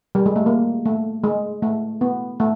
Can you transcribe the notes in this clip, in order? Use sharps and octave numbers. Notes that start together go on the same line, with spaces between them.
G3
G#3
A3
A#3
A3
G#3
A3
B3
A3